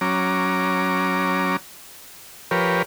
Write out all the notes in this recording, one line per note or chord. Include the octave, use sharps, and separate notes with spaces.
F#3 C#4 A#5 D6
F3 G4 A#4 B4 C#5